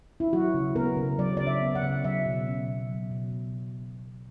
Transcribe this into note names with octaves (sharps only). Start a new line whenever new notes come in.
E4
F#3 F#4
C#3
B3 A#4
C#3
F#3 D5
C#3 D5
E5
B3
F#5
C#3
F#3 E5
B2
C#4
B2
F#3
B2